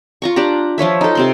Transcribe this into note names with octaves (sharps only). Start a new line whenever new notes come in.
F4 A#5 C#6
D4 G4 A#5
F3 F4 C#5 E5
D#4 A4
C3 C4 C6